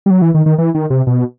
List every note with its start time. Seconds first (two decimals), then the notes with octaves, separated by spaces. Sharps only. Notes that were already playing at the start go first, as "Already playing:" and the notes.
0.06 G3
0.10 F#3
0.22 E3
0.34 D#3
0.46 D#3
0.58 E3
0.75 D#3
0.90 C3
1.07 B2